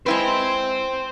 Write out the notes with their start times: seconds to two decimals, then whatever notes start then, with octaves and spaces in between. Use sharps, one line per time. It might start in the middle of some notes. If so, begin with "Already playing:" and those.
0.06 G#3 E4 B4 C5 G5